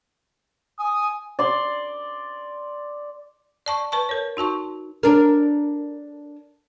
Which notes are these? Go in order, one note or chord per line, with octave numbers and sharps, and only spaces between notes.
G#5 D#6
D5 C6
D5 A5 C#6
B4 A5 C#6
A#4 C#5
D#4 F#4 A5 C#6
D4 A#4